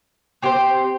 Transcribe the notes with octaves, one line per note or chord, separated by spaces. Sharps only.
C4 G4 C5